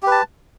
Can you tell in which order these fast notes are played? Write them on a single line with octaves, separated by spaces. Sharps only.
G4 B4 A5